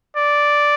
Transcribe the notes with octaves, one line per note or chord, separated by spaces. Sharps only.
D5